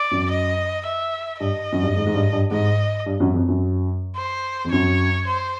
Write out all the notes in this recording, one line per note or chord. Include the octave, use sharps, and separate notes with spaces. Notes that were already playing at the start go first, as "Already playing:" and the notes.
Already playing: D5
F#2
D#5
E5
G2 D#5
F#2
G2
G#2
G#2
G2
G2
G#2 D#5
G2
F#2
F2
F#2
C5
F2
F#2 C#5
C5